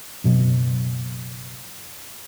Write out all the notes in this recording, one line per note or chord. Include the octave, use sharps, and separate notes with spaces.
F#1 B2 F#3